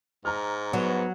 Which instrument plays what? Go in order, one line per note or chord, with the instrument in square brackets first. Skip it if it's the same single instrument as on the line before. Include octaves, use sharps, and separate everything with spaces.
[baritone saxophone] G#2 [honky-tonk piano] A#5 F6
[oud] F#3 [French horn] B3